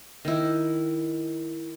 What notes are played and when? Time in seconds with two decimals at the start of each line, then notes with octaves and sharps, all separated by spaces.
0.25 D#3 E4